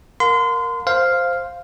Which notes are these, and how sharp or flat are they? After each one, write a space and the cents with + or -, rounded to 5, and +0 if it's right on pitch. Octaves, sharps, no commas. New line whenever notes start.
A#4 +0 F5 +40 C6 -30
C5 +0 F5 +0